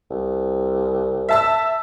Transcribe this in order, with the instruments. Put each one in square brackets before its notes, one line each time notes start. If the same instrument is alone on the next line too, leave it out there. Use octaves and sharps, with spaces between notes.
[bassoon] C2
[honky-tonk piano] E5 A5 E6